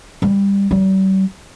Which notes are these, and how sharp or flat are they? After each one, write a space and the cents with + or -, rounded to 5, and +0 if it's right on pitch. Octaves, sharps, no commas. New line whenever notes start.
G3 +20
G3 -40